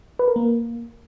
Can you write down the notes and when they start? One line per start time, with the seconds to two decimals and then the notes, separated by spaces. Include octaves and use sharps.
0.19 B4
0.28 A#4
0.36 A#3